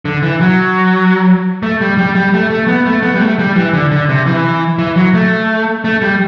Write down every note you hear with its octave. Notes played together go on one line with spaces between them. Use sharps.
D3
E3
F#3
A3
G3
G3
G3
A3
A3
B3
A3
B3
G3
A3
G3
E3
D3
D3
C3
E3
E3
F#3
A3
A3
G3